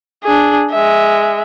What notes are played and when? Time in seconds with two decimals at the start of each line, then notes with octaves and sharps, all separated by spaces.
0.24 D4 G#4
0.70 G#3 E5